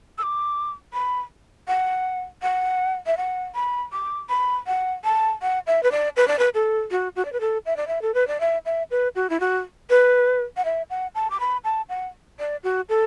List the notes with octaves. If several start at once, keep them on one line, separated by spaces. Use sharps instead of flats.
E6
D6
B5
F#5
F#5
E5
F#5
B5
D6
B5
F#5
A5
F#5
E5
B4
D5
B4
D5
B4
A4
F#4
F#4
D5
B4
A4
E5
D5
E5
A4
B4
D5
E5
E5
B4
F#4
E4
F#4
B4
F#5
E5
F#5
A5
D6
B5
A5
F#5
D5
F#4
A4